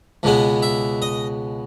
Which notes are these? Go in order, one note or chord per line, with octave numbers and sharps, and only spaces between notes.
C#2 B2 G#3 B3
E5
D#5